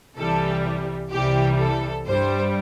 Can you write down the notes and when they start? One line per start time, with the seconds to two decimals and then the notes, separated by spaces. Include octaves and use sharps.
0.17 C2 C3 E3 G3 A4
1.11 C2 C3 E3 G3 G4
1.59 A4
2.06 G2 G3 C5